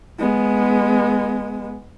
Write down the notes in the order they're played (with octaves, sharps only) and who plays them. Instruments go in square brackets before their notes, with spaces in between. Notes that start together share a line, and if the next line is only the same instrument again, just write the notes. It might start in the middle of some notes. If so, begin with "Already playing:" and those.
[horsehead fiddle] G#3 B3